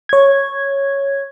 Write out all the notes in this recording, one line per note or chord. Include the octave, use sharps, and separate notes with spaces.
C#5 G#6